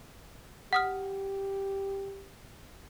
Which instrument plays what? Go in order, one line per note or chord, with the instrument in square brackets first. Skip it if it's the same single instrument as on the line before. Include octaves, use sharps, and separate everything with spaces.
[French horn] G4 [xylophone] F#5 D#6 F6